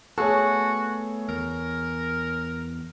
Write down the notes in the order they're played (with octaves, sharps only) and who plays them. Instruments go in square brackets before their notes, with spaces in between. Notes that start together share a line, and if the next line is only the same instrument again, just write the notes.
[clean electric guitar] A3 B3 A4 [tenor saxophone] F#4 [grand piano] G#4 C#5
[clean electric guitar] E2 [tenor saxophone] A#4